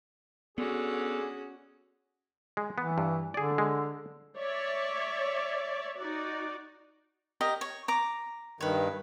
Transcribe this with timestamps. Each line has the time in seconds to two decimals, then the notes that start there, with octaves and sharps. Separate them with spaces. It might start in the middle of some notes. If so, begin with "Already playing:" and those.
0.58 D3 B3 C#4 F#4 G#4
2.57 G#3
2.78 E3 B3
2.98 G2
3.34 D3 G#4 D5
3.58 G#3
4.36 C#5 D5 E5
5.97 D#4 F#4 D5
7.41 G4 A#4 D#5
7.61 C#5
7.88 A#5 D6
8.61 G2 D#3 B4 C#5